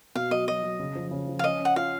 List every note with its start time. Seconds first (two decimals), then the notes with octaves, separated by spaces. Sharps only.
0.15 B2 F5
0.31 F#3 D#5
0.48 F#3 D#5
0.63 F#3
0.79 C#3
0.95 F3
1.11 C#3
1.28 F3
1.39 F5
1.44 C#4 D#5
1.59 C#4
1.65 F#5
1.76 F4 F5